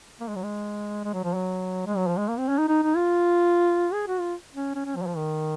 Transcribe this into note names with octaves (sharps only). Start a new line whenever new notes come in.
A#3
G#3
F#3
G#3
G#3
F#3
F3
F#3
G#3
F#3
F3
G#3
A#3
C4
C#4
D#4
D#4
D#4
F4
G#4
F#4
F4
C#4
C#4
C#4
F3
F#3
F3
D#3